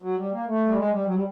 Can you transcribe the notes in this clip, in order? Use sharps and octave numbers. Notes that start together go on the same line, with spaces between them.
F#3
G3
A#3
A3
G3
G#3
G3
F#3
G3